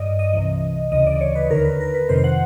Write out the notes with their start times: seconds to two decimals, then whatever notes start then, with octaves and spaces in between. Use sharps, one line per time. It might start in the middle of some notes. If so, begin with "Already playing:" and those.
Already playing: G2 D5 D#5
0.19 D#5
0.33 C2 C3 E3
0.92 D2 C#3 E3 D#5
1.07 D5
1.21 C#5
1.35 B4
1.50 D#2 D3 A#4
1.65 B4
1.80 A#4
1.94 B4
2.09 F2 C3 D#3 C5
2.24 F#5